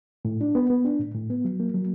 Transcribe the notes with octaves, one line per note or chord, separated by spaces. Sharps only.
A2
D4
B3
B3
D4
A2
A2
B3
F#3
A#3
F#3